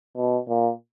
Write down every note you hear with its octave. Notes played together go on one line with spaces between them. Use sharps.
B2
A#2